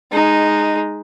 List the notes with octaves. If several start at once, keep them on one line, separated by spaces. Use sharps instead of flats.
G#3 D#4